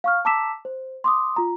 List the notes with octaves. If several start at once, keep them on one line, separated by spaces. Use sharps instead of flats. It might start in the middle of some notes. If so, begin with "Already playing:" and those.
F5 C#6 F6
A5 A#5 D6 E6 B6 E7
C5
C6 D6 D#6
F4 A#5